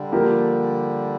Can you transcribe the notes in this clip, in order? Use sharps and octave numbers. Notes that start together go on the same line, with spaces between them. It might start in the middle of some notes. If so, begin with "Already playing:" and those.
Already playing: D3 G3
F3 A#3 G4